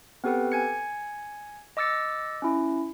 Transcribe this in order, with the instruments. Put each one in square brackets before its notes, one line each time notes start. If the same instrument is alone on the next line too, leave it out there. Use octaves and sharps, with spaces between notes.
[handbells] B3 C4 G4 A4 B4
G#5 G#6 C#7
D#5 D6 E6 A6 C#7
C#4 E4